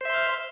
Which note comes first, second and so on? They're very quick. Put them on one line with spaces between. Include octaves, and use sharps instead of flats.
C5 E5 C6 F6